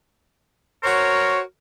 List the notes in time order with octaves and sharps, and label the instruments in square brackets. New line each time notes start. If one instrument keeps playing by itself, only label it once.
[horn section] F#4 C5 C#5 [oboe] A#4